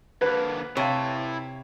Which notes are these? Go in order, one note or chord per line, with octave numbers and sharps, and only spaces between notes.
D3 A#3 B4
C3 E4 C#5 F5 A5